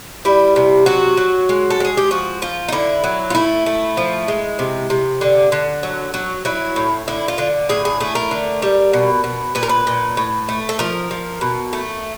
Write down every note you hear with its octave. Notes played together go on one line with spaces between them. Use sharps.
G3 E4
C3
F#3 F#4
F#3
G#3
A4
G#3 G#4
G4
F3 F#4
F3 F4
D#4
D3 E4
F#3
F4
A3 E4
A3
F3
G#3
C3
C3
D3
D3
F#3
F#3
F#3 E4
A2
D3 E4
F4
D3
A2 G#4
G#4
A3 G#4
A#4
D3
G3
B2
B2
A#2 B4
A#4
B4
A#2
A2
A3
A4
F3 A#4
F3
B2
A3